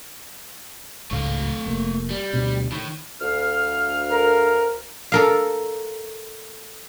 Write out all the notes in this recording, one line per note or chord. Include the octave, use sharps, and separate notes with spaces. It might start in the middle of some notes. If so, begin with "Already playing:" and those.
G#1 C#2 A2 A3 F5
F1 A#3
G3
D2 B2 C4
A2 D#3
D2 F5 F6
A#4
A4 A#4 F5